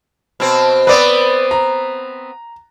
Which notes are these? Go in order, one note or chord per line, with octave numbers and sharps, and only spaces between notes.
B2 C4
B3 C4 B4 D5
A#5